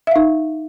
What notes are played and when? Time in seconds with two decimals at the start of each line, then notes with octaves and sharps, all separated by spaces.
0.07 E5
0.11 F5
0.16 D#4